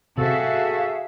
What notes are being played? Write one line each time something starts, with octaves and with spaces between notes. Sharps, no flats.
C3 F#4 G#4 A4 E5 F5